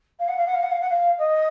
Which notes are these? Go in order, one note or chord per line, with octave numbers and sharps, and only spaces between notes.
F5
F#5
F5
F#5
F5
F#5
F5
F#5
F5
D#5